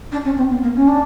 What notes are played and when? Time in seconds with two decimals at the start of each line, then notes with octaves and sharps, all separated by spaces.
0.12 D4
0.24 C#4
0.37 C4
0.50 B3
0.62 A#3
0.76 C#4
0.87 D4